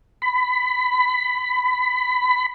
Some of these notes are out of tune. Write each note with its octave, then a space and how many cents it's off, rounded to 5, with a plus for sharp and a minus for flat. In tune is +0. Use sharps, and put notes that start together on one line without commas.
B5 +20